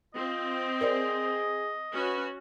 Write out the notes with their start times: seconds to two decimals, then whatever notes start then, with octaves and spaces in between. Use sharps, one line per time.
0.14 C4 F4 D#5
0.81 G#4 A#4 C5 D5
1.92 C#4 F#4 B4